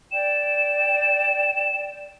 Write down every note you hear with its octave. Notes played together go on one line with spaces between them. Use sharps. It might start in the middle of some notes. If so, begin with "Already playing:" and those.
D5 G5 E7